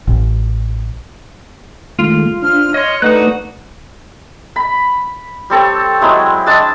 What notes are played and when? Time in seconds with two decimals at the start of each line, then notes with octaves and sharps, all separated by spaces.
0.08 A1
1.99 D#3 G#3 A3 F4
2.42 F3 D4 F6
2.74 C#5 D#5 C6 F6
3.02 D3 A3 D#4 F#4 B4 F#5 F#6
4.56 B5
5.50 G3 C4 A4 C#5
6.01 F#3 G#3 C4 E4
6.46 G#3 D4 A5 E6